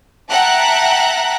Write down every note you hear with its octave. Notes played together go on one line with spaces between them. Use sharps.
E5 F#5 G5 A5 A#5 F#6